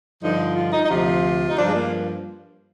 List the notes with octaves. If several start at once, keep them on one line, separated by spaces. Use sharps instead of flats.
G2 D3 F3 D#4
F4
D#4
D#4
D2 C3 F3 F4
D#4
G2 F3 D4
G#3
A#3